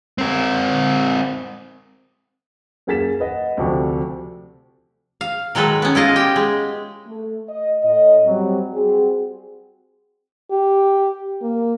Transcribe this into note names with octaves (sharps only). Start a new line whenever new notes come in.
C4 A#4
F#2 A#3 G#4 A6 B6 E7
B4 D#5 F#5
D2 C3 F3 D4 A4 C#6
F5
D#3 F#3 G#3 A4 B4
B3 C#4
E4 F4 D#5 F5
G4 G5
G#3
A3
D#5
A2 D#5
F#3 G3 C4
G3 C4 F#4 G#4
G4
A#3